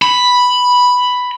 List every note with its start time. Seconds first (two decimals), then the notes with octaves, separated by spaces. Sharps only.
0.02 B5